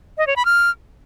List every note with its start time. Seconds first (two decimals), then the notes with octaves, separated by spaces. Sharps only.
0.18 D#5
0.27 C#5
0.36 B5
0.45 F6